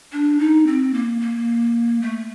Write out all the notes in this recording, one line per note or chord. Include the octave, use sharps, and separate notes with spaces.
D4
D#4
C4
A#3
A#3
A3